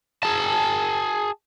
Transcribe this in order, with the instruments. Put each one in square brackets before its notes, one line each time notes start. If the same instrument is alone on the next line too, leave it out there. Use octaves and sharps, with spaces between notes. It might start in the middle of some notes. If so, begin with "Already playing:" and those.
[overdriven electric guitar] G#4 A5